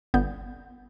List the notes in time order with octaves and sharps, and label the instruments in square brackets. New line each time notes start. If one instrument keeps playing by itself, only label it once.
[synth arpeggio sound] G1 B3 G6